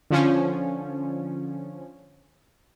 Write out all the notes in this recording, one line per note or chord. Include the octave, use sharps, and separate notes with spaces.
D3 F3 C#4